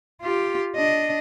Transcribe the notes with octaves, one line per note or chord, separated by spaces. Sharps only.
F4 G4
D4 D#5